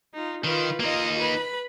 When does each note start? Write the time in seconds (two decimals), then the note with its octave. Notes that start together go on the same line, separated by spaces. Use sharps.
0.14 D#4 F4
0.44 D#3 F4 B4
0.80 A#3 D#4 F4 D#5
1.19 B4 B5